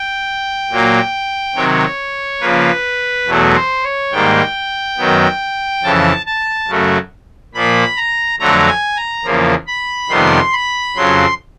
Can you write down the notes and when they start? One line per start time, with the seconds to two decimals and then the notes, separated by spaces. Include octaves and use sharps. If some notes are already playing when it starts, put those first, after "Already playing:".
Already playing: G5
0.71 A#2 F#3 A#3
1.55 C3 D#3 F#3 C#5
2.41 C#3 F3 A#3 B4
3.26 E2 B2 F#3 A3
3.55 C5
3.84 C#5
4.12 G#2 D#3 G3 A#3 G5
4.97 F#2 D#3 F#3 B3
5.83 F2 C#3 E3 A5
6.26 A5
6.68 F#2 C#3 F#3 A3
7.54 A#2 F3 A#3 B5
7.97 A#5
8.40 F2 D3 F#3 A3 A#5
8.68 G#5
8.97 A#5
9.24 E2 C#3 F3 A#3
9.67 B5
10.10 F2 C3 D#3 G3 B3 C6
10.53 B5
10.96 F2 C#3 F#3 C6